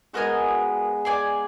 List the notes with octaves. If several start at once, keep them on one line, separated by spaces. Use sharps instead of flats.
G#3 B3 F#4 A#4 D#5 G#5
G#4 D5 G#5